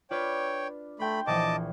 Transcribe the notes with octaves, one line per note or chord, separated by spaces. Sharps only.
D4 F4 B4 C#5 G5
A3 G5 B5 C6
A#1 E3 F3 D#5 A5 D6